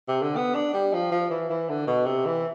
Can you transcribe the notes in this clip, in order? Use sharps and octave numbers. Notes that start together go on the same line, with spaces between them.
C3
D3
B3
D4
G3
F3
F3
E3
E3
D3
B2
C3
E3